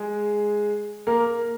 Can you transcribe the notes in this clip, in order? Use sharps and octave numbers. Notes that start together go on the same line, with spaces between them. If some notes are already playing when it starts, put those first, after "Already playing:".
Already playing: G#3 G#4
A#3 A#4